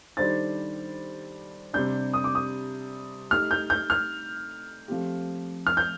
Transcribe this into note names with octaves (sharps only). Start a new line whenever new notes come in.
D#3 G3 D4 A4 C5 A6
C3 G3 D4 G6
D#6
D6
D#6
A3 D#4 G4 F6
G6
G6
F6
F3 A3 C4 G4
F6
G6